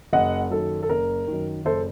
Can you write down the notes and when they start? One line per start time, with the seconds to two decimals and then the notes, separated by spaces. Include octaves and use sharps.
0.13 F#1 D#5 F#5
0.51 F#2 D#3 A4
0.83 A4
0.89 F#1 A#4
1.27 F#2 D#3
1.65 F#1 A4 C5